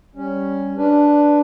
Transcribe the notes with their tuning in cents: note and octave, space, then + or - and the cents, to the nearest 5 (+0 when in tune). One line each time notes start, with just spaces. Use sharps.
G3 +0 C#4 +0
D4 +0 B4 +0